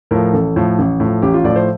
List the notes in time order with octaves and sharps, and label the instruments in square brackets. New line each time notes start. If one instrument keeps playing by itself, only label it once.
[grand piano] A2 F3 A#4
A1 A4
A2 F3
A1
A2 F3
A1 G4
F4
A2 F3 D5
C5